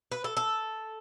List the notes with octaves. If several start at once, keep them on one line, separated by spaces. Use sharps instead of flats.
B4
A4
A4